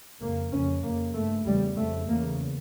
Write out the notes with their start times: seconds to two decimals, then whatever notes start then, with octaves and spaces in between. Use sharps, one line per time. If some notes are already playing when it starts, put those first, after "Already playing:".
0.21 F2 C#3 A#3
0.52 F2 C#3 C#4
0.83 F2 C#3 A#3
1.15 G2 A3
1.46 E2 C#3 G3
1.77 F2 C#3 A3
2.08 E2 C#3 A#3